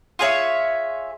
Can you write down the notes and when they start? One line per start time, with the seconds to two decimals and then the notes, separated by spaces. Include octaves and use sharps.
0.19 F4 G#4 C#5 E5